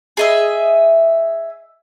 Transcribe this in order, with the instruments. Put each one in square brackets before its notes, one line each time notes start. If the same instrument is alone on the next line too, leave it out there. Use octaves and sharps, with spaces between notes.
[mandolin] G#4 D#5 E5